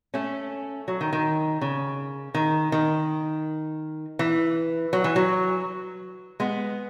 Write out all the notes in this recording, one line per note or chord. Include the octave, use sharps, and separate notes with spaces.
A3 C#4
F#3
D#3
D#3
C#3
D#3
D#3
E3
F#3
E3
F#3
G#3 B3